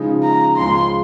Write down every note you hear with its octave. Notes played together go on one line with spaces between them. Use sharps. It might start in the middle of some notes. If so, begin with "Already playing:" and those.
Already playing: C#3 F3 G#3 D#4 G#4
A#5
C#2 C#3 F3 G#3 C6